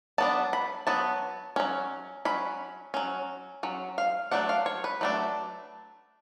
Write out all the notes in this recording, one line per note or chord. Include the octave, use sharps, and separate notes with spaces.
F#3 B3 D4 A5
B5
F#3 B3 A5
F#3 C#4
F#3 C#4 B5
F#3 C#4
F#3 C#4
F5
F#3 A3 D4 F#5
F5
C#5
B4
F#3 A3 D4